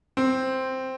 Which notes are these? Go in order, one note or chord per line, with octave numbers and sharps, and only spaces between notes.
C4